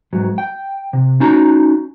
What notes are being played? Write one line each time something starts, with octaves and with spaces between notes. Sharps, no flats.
G#2 F#3
G5
C3
C#4 D#4 F#4 A#5